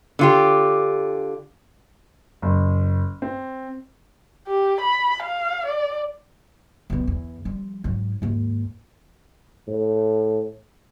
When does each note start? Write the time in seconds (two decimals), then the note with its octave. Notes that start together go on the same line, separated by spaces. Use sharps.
0.19 D3 F4 G4
2.42 F#1
3.22 C4
4.47 G4
4.81 B5
5.23 F5
5.66 D5
6.90 B1 B2
7.07 E2
7.45 F3 G3
7.84 G#2 F#3
8.22 D#2 G#2
9.68 A2